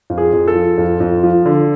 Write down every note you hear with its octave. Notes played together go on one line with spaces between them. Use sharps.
F2
G#4
F2
A4
F3
F2
F2
F3
D3